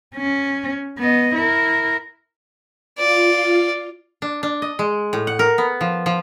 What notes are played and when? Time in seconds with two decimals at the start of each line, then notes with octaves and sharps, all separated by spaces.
0.15 C#4
0.98 B3 D#5
1.35 E4 A#4
2.98 F4 D5
4.22 D4
4.43 D4
4.62 D#5
4.79 G#3
5.13 A2
5.27 F#5
5.39 A#4
5.58 B3
5.81 F3
6.06 F3